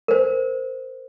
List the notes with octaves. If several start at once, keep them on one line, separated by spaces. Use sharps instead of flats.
A#4 C5